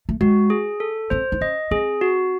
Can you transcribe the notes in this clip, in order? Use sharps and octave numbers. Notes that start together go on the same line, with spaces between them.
A3
G#3 F#4
G#4
A4
C4 C5
D#4
C#4 D#5
C4 G#4
F#4